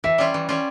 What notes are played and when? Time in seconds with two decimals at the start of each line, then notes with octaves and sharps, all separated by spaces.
0.04 E3 E5
0.18 G3 C#4 F4
0.34 E3
0.49 G3 C#4 F4